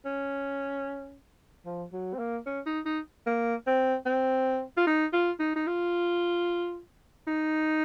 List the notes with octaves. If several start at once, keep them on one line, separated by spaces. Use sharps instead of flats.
C#4
F3
F#3
C4
A#3
C#4
D#4
D#4
A#3
C4
C4
F4
D#4
F4
D#4
D#4
F4
D#4